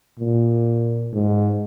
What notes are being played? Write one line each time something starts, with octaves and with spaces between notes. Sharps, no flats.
A#2
G#2